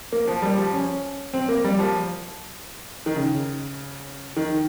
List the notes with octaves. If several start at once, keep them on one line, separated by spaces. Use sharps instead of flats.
A#3
F3
G3
F3
C#4
C4
A#3
G3
F3
D#3
C#3
D#3